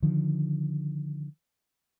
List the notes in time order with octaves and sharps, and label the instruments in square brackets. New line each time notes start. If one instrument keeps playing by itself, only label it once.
[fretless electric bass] D3 D#3 F3